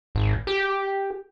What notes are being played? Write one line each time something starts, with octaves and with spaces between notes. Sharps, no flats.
G#1
G4